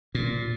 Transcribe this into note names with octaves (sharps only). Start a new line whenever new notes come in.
A#2